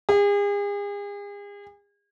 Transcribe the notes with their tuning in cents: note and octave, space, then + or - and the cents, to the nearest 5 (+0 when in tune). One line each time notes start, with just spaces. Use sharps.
G#4 -40